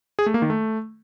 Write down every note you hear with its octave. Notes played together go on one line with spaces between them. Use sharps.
G#4
A3
A#3
D#3
A3